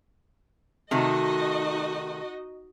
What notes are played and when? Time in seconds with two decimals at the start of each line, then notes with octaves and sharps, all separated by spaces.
0.91 C3 D#3 A3 D#4 F#4 D#5